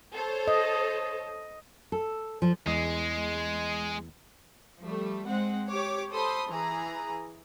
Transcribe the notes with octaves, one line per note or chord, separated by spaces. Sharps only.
A4 C5 C#5
D#5
A4
F3
E2 G#3 D#5
F3 G3 A3
G#3 C4 F#5
G4 C#5 D6
A4 C5 B5 C6 D#6
E3 G#4 A#5